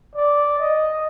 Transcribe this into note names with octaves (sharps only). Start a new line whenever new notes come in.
D5
D#5